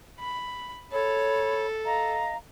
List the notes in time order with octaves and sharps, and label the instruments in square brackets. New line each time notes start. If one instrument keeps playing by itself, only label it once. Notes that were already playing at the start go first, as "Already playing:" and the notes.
[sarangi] B5
[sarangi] A4 [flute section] C#5 B5
[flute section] D#5 F5 A#5